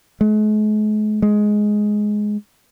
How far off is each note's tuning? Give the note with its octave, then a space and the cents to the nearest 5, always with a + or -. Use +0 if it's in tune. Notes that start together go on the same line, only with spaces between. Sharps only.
G#3 +45
G#3 +10